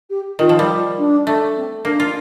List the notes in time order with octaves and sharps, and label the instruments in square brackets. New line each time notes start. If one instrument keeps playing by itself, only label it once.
[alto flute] G4
[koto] D#3 [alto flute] F4
[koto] F3
G3
[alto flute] D4
[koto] A3
[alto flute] C4
[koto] A#3 [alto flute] D4
[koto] F4